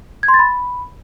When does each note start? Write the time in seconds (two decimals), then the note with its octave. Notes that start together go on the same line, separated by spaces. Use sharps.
0.23 G#6
0.28 C6
0.34 A6
0.39 B5